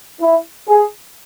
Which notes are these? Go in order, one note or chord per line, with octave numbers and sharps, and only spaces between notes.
E4
G#4